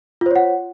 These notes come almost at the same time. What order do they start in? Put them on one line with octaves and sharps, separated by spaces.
F4 C5 C#5 F#5